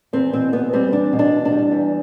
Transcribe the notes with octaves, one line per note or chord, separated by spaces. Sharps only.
E2 C4
B2 C4
E2 B3
G3 C4
E2 D4
B2
D4
E2
D4
G3
E2